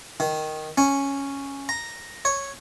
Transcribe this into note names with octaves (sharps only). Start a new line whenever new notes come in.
D#3
C#4
A#5
C#5